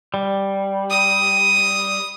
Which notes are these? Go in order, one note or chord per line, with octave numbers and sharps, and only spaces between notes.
G3
D#6